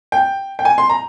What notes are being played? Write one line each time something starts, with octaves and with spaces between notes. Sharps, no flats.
G5
G5
G#5
C6
A#5